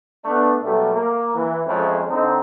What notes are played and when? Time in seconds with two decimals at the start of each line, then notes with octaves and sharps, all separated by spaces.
0.25 A3 B3 D4
0.62 B2 F#3 G3 A3
0.92 A#3
1.35 E3
1.66 F2 F3 G#3 A3 C#4
2.08 D3 C4 D#4